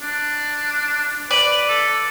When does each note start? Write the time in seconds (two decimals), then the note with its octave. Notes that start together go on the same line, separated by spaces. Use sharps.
0.02 D4
1.31 B4 D5
1.68 A4